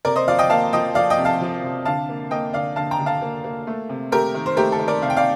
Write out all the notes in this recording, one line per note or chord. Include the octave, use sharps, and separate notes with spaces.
C3 A#4 D5
C5 D#5
F3 D5 F5
D#5 G5
A#3 F5 A5
F3 D#5 G5
F3 D5 F5
D#5 G5
C3
F5 A5
F3
C3
D3 F5 A5
A#3
A#3 D#5 G5
D3 D5 F5
D3 F5 A5
G5 A#5
D3
F5 A5
A#3
A#3
A3
C3
A3 G4 A#4
D#3
C5
A3 G4 A#4
A4
D#3
A#4 D5
C3 F5
G5
D5 F5